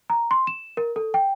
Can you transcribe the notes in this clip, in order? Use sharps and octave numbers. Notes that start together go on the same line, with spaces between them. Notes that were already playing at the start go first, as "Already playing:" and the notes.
A#5
C6
E7
A#4
A4
G5